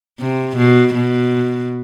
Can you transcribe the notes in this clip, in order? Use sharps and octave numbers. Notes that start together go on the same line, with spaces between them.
C3
B2
B2